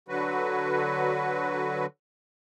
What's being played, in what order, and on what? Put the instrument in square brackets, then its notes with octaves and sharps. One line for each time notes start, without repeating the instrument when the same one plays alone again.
[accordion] D3 F#3 F#4 B4